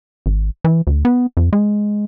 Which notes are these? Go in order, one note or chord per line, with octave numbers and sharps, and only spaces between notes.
G#1
E3
D2
B3
F2
G#3